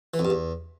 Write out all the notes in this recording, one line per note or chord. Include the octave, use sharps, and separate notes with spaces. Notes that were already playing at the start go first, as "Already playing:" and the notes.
E3
F2
G2
E2